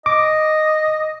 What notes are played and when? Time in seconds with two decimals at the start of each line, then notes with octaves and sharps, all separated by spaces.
0.06 D#5 D6